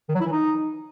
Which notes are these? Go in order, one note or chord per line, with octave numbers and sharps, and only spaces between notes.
D#3
F#3
E4
E3
D#4